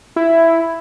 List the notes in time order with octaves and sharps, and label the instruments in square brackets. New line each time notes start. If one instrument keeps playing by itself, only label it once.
[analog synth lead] E4